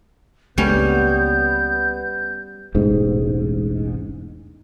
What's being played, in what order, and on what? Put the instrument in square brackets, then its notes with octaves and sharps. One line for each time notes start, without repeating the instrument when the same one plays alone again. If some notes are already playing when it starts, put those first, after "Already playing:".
[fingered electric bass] C#2 G#3 A#3 [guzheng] G3 C#4 [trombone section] B3 [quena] G6
[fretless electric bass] E1 A1 G#2